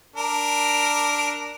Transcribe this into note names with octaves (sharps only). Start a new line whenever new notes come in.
D4 A#4